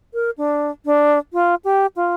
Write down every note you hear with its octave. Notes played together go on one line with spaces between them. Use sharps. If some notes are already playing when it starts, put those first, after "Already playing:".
A#4
D4
D4
F4
G4
F4